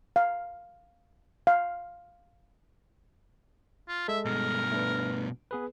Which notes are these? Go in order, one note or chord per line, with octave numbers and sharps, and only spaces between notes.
F5
F5
F4
G#3 A4 E5
G2 B2 A#4
A3 D4 B4
B3 G#4 B4